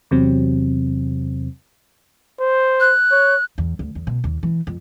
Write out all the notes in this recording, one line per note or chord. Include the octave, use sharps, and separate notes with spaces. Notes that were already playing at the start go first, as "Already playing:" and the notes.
E2 C3 F#3 C4
C5
F#6
C#5
E2
D2
E2
B2
D#2
E3
F2